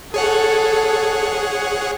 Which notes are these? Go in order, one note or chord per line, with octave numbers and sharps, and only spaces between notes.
G#4 A4 C#5 F#5